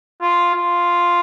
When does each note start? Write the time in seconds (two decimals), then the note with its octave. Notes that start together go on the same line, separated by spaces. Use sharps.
0.22 F4
0.54 F4